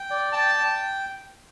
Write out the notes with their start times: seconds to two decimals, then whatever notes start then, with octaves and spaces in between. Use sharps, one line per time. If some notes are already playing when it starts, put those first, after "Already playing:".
Already playing: G5
0.11 D5
0.33 G5 A5
0.55 G5